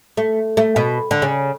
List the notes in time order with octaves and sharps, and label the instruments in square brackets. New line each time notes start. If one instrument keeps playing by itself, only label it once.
[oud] A3
A3
B2
D3
C#3